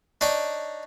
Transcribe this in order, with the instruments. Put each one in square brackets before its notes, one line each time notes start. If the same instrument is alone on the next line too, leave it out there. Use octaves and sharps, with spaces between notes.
[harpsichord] D4 D#4 C#5 D#5 G5